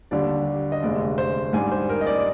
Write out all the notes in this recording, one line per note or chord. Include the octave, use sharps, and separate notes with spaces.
D#2 D3 G3 D4 D5
D#5
F1 D#2 D3 G#3 D5
C5
G#2 G3 D4 G#5
C5
A#4
D#5
D5
D5